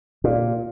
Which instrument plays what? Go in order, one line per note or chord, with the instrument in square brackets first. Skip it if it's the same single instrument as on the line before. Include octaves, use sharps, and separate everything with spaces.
[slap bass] A#2